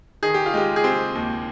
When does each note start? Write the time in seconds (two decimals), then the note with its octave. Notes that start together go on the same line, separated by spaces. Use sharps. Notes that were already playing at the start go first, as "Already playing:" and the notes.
0.23 D#3 G#4
0.34 G4
0.46 F4
0.54 G#3 G4
0.76 G#4
0.84 C4 G4
1.15 D#2